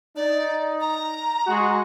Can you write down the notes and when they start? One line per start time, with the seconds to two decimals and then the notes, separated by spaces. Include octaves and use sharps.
0.16 D#4 D5
0.81 A#5
1.47 G#3 F#4